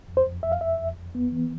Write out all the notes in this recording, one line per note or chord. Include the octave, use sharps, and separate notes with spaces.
F2
C5
F2
F2 E5
F5
F2 E5
F2
F2
B3
E3